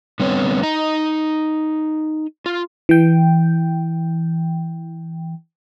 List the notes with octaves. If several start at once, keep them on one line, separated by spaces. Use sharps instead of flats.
D3 G3 B3 C4 C#5
D#4 D#5 A#5
F4
E3 G5